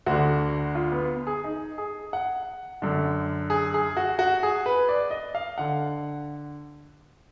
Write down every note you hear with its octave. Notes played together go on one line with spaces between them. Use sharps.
D2 D3 F#4
F4
B3
G#4
D#4
G#4
F#5
F#2 D3
G#4
G#4
F#4
F#4
G#4
B4
D5
D#5
F5
D3 F#5